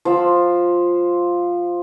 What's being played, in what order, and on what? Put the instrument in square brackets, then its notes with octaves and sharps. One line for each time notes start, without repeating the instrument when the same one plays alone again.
[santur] F3 C6 E6